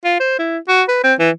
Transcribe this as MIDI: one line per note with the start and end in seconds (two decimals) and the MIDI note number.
0.04 0.15 65
0.20 0.38 72
0.39 0.58 64
0.68 0.83 66
0.89 1.01 71
1.04 1.14 60
1.19 1.30 52